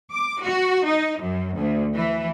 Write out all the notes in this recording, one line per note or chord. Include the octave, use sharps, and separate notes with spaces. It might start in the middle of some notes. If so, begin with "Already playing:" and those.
D6
F#4
D#4
F#2
D2
E3